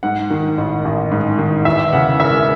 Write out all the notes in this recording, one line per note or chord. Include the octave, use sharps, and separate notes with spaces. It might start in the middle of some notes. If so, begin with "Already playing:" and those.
G#2 F#5
D#3
A1
A1
G#2
D#3
E2 E5
C#3 F#5
E1 E5